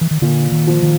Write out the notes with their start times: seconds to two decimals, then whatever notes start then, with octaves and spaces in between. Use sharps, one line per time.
0.01 E3
0.11 D#3
0.21 A#2 D3
0.52 D#3
0.67 F3
0.83 D#3